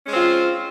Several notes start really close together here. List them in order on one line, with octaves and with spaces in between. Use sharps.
C#4 G#3 C4 F4